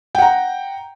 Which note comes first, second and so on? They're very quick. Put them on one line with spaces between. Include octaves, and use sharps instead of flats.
G5 F#5 A#5